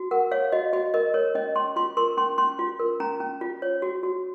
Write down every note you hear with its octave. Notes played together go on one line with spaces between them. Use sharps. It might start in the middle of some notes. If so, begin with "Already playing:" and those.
Already playing: F#4
A#4 F#5
C#5 F5
F#4 D#5
F#4 D#5
A#4 D#5
A#4 C#5
C#4 D#5
C#4 C6
F4 C6
A#4 C6
C#4 C6
C#4 C6
F4
A#4
C#4 A#5
C#4
F4
C#5
F#4
F#4